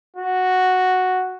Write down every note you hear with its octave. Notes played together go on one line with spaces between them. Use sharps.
F#4